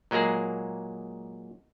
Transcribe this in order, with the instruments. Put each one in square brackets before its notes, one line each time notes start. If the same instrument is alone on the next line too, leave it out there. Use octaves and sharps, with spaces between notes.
[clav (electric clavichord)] A#2 F#3 G#3 A#3 G#4